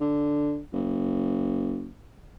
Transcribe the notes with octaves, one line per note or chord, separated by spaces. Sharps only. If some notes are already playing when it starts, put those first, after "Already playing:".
D3
F#1